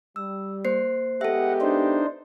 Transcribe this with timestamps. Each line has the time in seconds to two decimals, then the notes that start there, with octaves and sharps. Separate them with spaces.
0.16 G3 E6
0.65 A#3 C5 C7
1.21 G#3 B3 G4 A4 E5 F#5
1.61 D4 D#4 C5